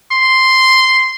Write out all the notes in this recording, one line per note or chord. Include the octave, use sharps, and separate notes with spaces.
C6